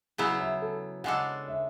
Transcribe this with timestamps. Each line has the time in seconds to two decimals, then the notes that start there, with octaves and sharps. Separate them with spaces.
0.18 C#3 F#3 B3 E4 G#4
0.40 E5
0.62 A4
1.04 C#3 G#3 D4 A4 F#5
1.48 E5